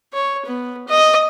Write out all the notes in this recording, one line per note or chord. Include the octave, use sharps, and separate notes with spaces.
C#5
B3
D#5